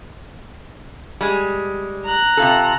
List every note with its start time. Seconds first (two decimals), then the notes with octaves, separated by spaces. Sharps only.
1.21 G3 G#3
2.05 A#5 F#6
2.37 C3 F4 A4